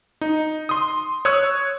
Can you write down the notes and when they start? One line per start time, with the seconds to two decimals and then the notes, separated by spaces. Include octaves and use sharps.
0.21 D#4
0.69 C6 D#6
1.25 C#5 D#6 E6 F#6